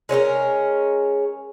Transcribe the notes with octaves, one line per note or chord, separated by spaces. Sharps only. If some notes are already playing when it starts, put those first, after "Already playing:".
G#3 C#4 E4 A#4